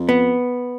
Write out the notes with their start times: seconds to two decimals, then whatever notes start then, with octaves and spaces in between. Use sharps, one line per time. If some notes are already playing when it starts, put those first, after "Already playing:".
Already playing: F2
0.09 B3